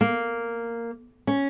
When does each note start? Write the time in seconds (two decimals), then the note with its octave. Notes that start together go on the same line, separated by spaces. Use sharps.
0.01 A#3
1.27 C#4